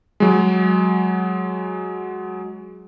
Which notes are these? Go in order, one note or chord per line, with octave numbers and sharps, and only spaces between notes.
F#3 G#3